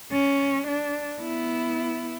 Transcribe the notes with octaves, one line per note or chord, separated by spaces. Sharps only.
C#4
D4
B3 E4